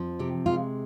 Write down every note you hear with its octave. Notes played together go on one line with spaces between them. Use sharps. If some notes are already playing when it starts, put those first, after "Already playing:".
Already playing: F2 F3
C3 G4
G#3 F4